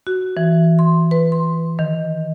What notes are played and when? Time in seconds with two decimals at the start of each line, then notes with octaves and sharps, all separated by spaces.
0.07 F#4
0.37 E3
0.79 C6
1.11 B4
1.32 C6
1.79 D#3